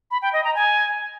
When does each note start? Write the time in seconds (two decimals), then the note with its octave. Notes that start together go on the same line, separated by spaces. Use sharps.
0.11 B5
0.22 G5
0.33 D#5
0.44 A#5
0.55 G#5